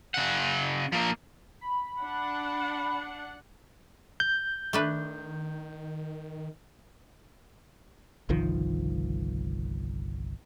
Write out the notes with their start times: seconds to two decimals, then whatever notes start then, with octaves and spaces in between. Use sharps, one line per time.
0.14 C#3 F#5
0.92 F3 A#3
1.61 B5
2.00 D4 F#5
4.20 G6
4.73 D#3 A3 D4 B4
8.29 G1 C2 D#3 F3